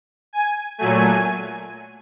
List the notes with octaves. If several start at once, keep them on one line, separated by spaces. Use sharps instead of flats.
G#5
A#2 F#3 A3 G#5